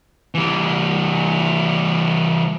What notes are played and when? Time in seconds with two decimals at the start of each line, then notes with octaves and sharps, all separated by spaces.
0.34 E3 G3